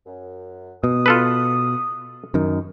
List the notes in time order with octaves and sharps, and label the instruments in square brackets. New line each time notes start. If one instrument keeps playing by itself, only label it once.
[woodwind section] F#2
[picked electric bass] B2 [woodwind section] D#6
[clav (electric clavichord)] F4 A4 B4
[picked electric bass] F#2 D#3